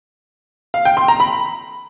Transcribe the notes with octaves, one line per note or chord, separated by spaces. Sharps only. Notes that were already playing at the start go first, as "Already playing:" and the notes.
F5
G5
C6
A#5
B5